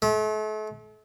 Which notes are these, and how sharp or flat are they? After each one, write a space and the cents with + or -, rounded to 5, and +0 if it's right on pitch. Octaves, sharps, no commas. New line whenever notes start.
A3 -40